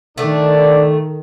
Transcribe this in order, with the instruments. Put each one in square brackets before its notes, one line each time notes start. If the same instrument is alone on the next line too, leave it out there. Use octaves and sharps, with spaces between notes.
[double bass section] D#3 [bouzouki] A3 [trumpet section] D4 D5